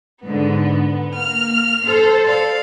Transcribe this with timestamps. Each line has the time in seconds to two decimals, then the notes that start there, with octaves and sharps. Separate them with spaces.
0.23 G#2 D3 B3
1.15 A#3 F6
1.85 A4 C5
2.24 D5 F5